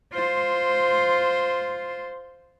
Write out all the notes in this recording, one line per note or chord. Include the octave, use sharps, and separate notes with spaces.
F4 C5